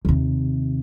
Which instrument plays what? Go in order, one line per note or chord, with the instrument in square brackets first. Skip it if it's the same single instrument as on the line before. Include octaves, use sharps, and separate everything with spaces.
[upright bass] D#2 C3